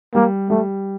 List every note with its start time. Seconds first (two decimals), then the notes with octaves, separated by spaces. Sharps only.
0.14 G3 A#3
0.50 G3 A3